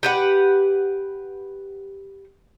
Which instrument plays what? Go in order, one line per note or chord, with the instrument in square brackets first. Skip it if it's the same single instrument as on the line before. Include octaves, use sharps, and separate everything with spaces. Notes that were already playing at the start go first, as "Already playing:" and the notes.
[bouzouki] G4 B4 F#5